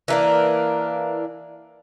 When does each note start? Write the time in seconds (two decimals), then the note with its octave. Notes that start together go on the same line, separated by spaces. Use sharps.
0.08 E3 A#3 D4